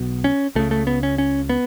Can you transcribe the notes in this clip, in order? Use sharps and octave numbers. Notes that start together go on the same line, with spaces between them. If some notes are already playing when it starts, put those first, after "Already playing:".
Already playing: B1 B2
C#4
C#2 C#3 A3
A3
B3
C#4
C#4
B3